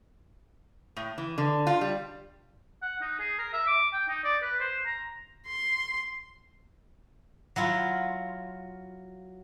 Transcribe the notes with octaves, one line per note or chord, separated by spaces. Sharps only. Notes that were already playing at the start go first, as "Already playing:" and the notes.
A2
E3
D3
F4
G3
F#5
D#4
G#4
A#4
E5
D6
G5
D#4
D5
B4
C5
A#5
C6
F#3 E4 F4